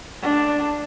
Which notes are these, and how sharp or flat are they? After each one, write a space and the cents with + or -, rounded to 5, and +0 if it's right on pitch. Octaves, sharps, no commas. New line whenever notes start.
A3 +0 D4 +0